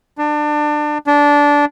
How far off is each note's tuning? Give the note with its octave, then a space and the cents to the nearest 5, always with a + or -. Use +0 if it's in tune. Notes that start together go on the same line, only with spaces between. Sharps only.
D4 +25
D4 -15